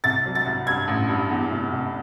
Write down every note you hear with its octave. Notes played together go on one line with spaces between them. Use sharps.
C2 A6
F#3
A6
C2
G2 G#6
A1
G2
E2
F1
F1